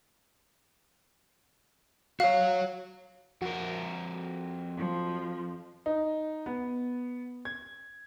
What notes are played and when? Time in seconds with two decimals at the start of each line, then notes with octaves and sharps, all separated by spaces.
2.20 F#4 C#5 F5
3.42 F2 F#4 A#4
4.76 F3
5.86 D#4
6.46 B3
7.45 G#6